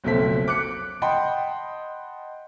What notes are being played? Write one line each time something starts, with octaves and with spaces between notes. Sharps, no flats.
F#1 B1 F2 A3 C4 B6
D6 F#6 C#7
D#5 F#5 G5 A5 B5 C6